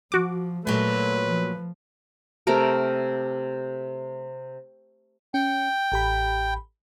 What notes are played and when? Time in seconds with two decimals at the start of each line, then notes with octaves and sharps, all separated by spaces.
0.12 F3 F#4 D6
0.67 A#2 F#3 A3 B4
1.26 F3
2.47 C3 A3 G4 A#4
5.34 C#4 G5
5.92 A1 G4 B5